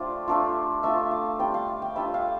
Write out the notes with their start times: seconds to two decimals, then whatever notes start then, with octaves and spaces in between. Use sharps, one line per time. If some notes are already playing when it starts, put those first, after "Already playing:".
Already playing: A3 D4 F4 G4 C5 D5
0.28 A3 D4 F4
0.83 A3 D4 F4 E5
1.11 F5
1.39 G3 D4 F4 G5
1.54 F5
1.82 G5
1.96 G3 D4 F4 E5
2.14 F5